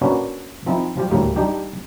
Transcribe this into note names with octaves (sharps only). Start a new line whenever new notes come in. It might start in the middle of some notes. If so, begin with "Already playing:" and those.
A#3 C#4 D4 F#4 B4
F3 C4 D#4 E4
F3 G3 F4 G4
D2 A2 G3 A#3
G3 D4 D#4 G4